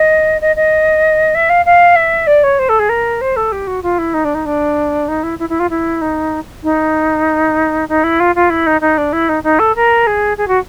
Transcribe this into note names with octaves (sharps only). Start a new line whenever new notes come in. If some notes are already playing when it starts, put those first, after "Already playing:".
Already playing: D#5
D#5
D#5
E5
F5
F5
E5
D5
C#5
C5
A4
G#4
A#4
C5
A4
G4
F#4
F4
E4
D#4
D4
D#4
D4
D#4
E4
E4
E4
F4
E4
D#4
D#4
D#4
E4
F4
F4
E4
D#4
D#4
D4
E4
D#4
D#4
A4
A#4
G#4
G#4
F#4